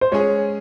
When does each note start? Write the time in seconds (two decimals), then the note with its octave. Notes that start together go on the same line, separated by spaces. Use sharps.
0.01 C5
0.12 G#3 C#4 G#4 C#5